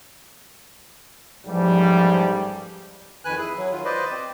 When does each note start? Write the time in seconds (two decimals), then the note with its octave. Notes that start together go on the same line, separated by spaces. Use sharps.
1.47 A1 G#2 F3 G3
3.25 F2 D#3 B4 G#5 F#6
3.38 E4 G#4
3.57 F#3
3.72 D#3 F#3 F4
3.85 B4 C5 D5 D#5
4.12 C4